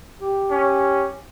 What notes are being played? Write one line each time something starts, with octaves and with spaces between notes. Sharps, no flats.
G4
C#4